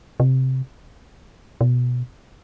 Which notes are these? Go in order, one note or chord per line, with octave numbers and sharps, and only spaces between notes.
C3
B2